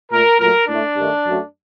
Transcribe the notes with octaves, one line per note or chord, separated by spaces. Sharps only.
A#2 A3 A#4
A#2 F#3 A3 A#4
A2 A3 D4
G2 D#3 A3
F#2 F#3 A3